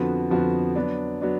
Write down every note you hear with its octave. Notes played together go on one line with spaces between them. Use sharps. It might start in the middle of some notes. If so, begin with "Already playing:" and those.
Already playing: F2 D3 F3 B3 F#4
F2 D3 F3 B3 F#4
F#3 B3 D4
F#3 B3 D4